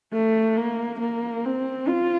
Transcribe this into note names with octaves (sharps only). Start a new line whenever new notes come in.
A3
A#3
A#3
C4
F4